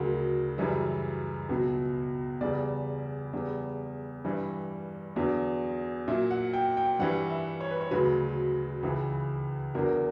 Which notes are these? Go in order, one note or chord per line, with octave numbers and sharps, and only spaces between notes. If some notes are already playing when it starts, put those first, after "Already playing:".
Already playing: D2 C#3 F#3 A#4
F#2 C#3 E3 G3
C#2 B2 F#3
E2 C#3 G3 D5
E2 C#3 G3
G2 E3 G3
E2 D3 F#3
A#2 F#3 E5
F#5
G5
G5
G2 E3 G3 F#5
E5
C#5
B4
C#5
D2 C#3 F#3 B4
C#2 C#3 E3
E2 D3 F#3 A#4